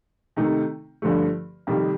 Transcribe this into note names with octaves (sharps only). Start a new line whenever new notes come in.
C3 D#3 A3 D#4
G2 D3 F3 A3
F2 C3 D#3 G3